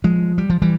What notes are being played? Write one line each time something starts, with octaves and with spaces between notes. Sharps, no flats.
F3 G#3
G3
F3
E3 G3